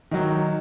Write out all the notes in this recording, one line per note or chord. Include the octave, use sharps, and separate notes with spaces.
D#3 F#3 D#4